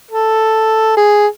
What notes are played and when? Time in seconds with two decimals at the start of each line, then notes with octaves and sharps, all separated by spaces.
0.11 A4
0.97 G#4